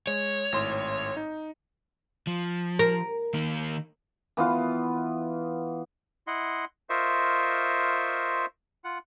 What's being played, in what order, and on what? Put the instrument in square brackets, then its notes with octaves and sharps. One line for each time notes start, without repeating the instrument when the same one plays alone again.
[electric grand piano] G#3 [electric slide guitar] C#5
[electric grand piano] G#1 A2 C6
D#4
[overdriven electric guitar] F3
[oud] A#4
[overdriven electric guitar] D#3 A#3
[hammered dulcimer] E3 B3 F4
[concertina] E4 D#5 F#5 C6
F4 A#4 C5 D#5 E5 C#6
F4 F#5